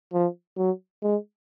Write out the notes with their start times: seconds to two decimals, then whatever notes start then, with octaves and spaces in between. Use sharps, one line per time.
0.13 F3
0.58 F#3
1.02 G#3